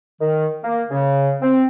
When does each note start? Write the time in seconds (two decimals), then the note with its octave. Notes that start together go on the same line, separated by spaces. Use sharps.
0.21 D#3
0.63 A#3
0.91 C#3
1.42 C4